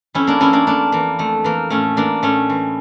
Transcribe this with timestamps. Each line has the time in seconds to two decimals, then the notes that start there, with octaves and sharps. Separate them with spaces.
0.14 F2 C#4 E4
0.27 A#3 D4
0.40 E3 C#4 E4
0.53 A#3 D4
0.67 F2 A#3 D4
0.92 E3 A#3
1.19 F2 A3
1.44 E3 A#3
1.70 A2 A3 C#4
1.97 E3 A#3 D4
2.23 A2 A3 C#4
2.49 E3